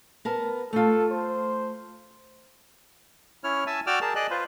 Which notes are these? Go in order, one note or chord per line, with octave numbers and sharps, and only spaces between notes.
B3 A#4 A5
A3 F4 A4
C5
C#4 E4 C#5 F6
E5 G#5 A5 E6
F#4 D5 G5 D6 E6 F6
G#4 A#4 A5
G#4 D5 D#5 F#6
F4 B4 C5